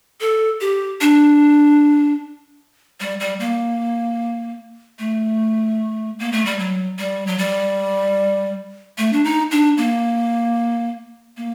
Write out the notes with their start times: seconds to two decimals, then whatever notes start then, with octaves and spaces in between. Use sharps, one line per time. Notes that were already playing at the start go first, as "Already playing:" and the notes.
0.21 A4
0.61 G4
1.01 D4
3.00 G3
3.20 G3
3.40 A#3
4.99 A3
6.19 A#3
6.32 A3
6.46 G3
6.59 F#3
6.98 G3
7.27 F#3
7.38 G3
8.98 A3
9.13 D4
9.24 D#4
9.51 D4
9.77 A#3
11.37 A#3